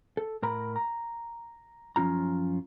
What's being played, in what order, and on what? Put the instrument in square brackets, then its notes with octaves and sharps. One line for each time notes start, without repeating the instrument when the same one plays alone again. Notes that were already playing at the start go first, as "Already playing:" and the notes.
[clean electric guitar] A4
A2 A#4 A#5 B5
A#5
F#2 F3 C#4 F4 A#5